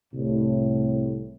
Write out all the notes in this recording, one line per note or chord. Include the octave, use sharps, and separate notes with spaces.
C2 A2